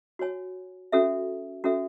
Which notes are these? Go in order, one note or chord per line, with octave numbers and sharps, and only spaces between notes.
F#4 C#5 G#5
C#4 F#4 A4 E5
C#4 F#4 A4 E5